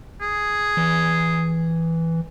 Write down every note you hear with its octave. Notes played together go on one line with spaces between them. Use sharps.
G#4
E3